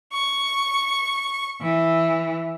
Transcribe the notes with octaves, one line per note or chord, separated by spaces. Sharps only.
C#6
E3